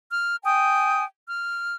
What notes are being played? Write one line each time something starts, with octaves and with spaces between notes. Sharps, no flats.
F6
G5 G#5 D#6
F6